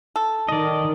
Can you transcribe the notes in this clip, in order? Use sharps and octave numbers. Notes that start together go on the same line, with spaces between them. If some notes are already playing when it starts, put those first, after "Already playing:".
A4
D#3 D5 D#5